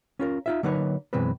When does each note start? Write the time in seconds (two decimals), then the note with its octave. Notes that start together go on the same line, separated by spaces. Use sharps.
0.19 C#4 F4 A#4
0.46 D#4 F4 E5
0.63 D3 F#3 A#3 D#4 B4 C#5
1.13 F#2 B2 E3 G#3 C4 B4